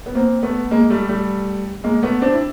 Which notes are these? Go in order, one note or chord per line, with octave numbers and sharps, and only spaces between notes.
B3
A#3 C4
A3 B3
G#3 A#3
G3 A3
G3 A3
G#3 A#3
A3 B3
C4 D4
E4